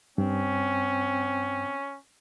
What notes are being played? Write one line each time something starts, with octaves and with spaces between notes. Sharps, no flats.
G2 C4 C#4